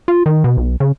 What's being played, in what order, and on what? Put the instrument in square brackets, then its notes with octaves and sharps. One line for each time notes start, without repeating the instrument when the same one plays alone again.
[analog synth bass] F4
D#3
B2
B1
C#3